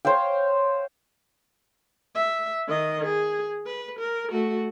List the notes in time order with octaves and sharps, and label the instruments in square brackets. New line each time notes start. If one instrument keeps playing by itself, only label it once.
[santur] C5 C#5 F5 G5
[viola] E5
D#3 D#5
G#4
B4
A#4
A3 F#4